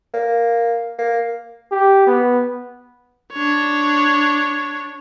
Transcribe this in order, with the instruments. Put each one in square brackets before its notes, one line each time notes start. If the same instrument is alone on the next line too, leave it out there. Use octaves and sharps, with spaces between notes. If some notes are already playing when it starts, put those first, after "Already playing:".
[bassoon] A#3
A#3
[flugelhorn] G4
B3
[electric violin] D4 C#5